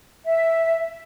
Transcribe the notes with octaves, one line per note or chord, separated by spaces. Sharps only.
E5